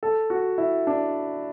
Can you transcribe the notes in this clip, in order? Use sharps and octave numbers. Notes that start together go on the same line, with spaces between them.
A4
F#4
E4
D4